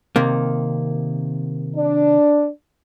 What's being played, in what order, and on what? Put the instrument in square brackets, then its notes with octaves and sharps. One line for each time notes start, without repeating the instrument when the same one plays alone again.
[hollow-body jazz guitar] C3 D#3 A#3
[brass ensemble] D4